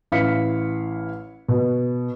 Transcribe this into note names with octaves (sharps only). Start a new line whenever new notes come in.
A1 E4 F5 B6 C#7
B2